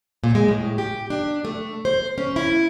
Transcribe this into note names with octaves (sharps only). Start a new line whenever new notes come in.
A#2
G#3
A2
G4
D4
A3
C5
C#4
E4